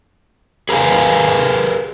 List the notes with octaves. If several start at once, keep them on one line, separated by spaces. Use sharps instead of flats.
G#4 A#4 B4 F5 G#5